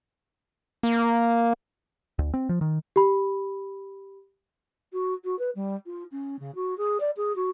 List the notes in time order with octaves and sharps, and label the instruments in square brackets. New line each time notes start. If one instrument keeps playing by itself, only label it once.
[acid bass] A#3
[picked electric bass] D2
C4
F3
D#3
[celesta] G4 B5
[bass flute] F#4
F#4
B4
G3
F4
C#4
C#3
F#4
G#4
D5
G#4
F#4